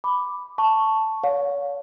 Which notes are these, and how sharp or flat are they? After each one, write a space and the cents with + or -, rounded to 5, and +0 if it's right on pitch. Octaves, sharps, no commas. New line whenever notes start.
B5 +5 D6 +0
A5 +0 C#6 +0
C#5 +40 F5 +35